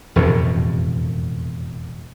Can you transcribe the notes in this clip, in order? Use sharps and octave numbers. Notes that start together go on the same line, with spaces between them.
E1 F2 A2 C3